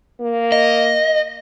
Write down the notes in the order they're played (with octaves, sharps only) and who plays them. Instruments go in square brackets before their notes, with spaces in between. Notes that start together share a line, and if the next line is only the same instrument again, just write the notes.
[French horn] A#3
[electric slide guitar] D#5